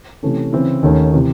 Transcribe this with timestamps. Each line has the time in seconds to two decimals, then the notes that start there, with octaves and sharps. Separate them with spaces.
0.23 C3 E3 A3 C#4
0.53 C#3 E3 C4 E4
0.83 D#2 D#3 A3 C#4
1.14 C3 E3